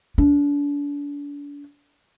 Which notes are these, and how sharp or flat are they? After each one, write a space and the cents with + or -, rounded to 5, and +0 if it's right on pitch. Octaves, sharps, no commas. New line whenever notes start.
D4 -35